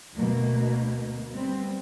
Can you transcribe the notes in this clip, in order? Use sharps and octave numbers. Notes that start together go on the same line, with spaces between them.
D2 B2 A#3
G3 B3 C4